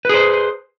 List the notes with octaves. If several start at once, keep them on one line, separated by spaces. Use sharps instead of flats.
G#4 B4 C5